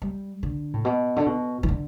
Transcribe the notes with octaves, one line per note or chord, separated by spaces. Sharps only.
G3
D3
A2
B2
D3
B2
E3
D3